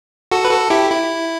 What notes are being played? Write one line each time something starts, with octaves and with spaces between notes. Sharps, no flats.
F#4 A4
B4
F#4 A4
E4 G4
E4